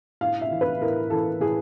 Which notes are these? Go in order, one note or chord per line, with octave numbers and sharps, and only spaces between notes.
A2 F5
E5
E3
B4
A2 A#4
E3 A4
A2 G#4